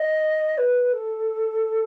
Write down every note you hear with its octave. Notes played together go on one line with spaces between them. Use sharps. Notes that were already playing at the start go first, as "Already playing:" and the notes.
Already playing: D#5
B4
A4